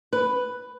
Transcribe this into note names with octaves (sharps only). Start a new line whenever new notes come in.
B4